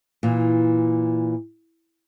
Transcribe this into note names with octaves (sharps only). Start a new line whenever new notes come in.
A#2 E3